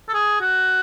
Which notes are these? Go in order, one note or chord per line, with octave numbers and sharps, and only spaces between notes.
A4
G#4
F#4